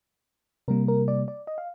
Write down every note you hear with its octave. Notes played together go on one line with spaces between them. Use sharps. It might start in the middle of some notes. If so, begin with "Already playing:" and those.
C3 G3 A#3 A#4
A#4
D5
D5
D#5
F5